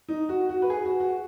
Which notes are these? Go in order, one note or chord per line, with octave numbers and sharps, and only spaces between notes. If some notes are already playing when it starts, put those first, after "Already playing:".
D#4
F#4
F#4
B4
G#4
F#4
F#4